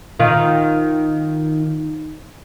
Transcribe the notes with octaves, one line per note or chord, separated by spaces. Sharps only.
D#3 F4